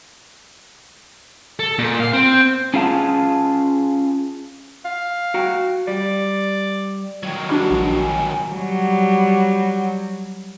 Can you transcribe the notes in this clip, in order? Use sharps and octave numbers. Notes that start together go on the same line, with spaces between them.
A4
A#2
F5
C4
C#4 F4 G#4 F5 G#5 A5
F5
F#4 G5 A#5
G3 D5
D#3 F#3 G#6
G3 D4 F#4
A#1
G#5
F#3 G3